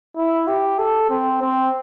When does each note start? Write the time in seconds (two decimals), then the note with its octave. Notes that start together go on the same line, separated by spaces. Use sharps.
0.17 E4
0.48 G4
0.79 A4
1.10 C4
1.42 C4